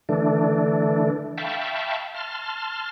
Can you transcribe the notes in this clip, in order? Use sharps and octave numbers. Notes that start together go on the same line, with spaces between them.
D3 E3 A3 D4
E5 F5 G5 A5 B5 C#6
A5 C6 F6